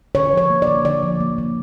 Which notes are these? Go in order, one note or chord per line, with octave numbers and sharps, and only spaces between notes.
D3 C#5
F3 C#5
A#3
D5
D3
D3 D5
F3
A#3
D3